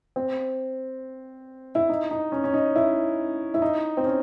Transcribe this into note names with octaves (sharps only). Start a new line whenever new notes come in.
C4
E4
D#4
D#4
C#4
C#4
D#4
E4
E4
D#4
C4
C#4